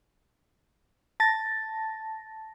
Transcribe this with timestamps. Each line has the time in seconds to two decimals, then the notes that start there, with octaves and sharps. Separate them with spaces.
1.20 A5 A6 A#6